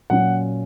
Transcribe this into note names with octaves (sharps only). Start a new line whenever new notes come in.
A#2 F#3 C#4 F#5